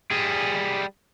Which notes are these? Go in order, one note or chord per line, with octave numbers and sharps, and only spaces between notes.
G3 G#4